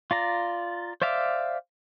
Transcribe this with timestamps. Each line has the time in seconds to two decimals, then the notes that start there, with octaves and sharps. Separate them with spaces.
0.11 F4 D5 A#5
1.02 C5 D5 E5 F5 D6